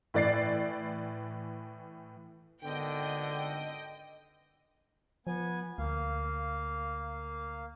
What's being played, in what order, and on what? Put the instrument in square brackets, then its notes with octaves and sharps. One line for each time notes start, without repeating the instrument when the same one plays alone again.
[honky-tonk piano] A2 E3 D5 A6 C7
[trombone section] G#1 D3 B3 [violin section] D#5 G5
[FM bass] F3 [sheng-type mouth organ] B3 G#5
[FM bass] D2 [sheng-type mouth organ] A#3 F5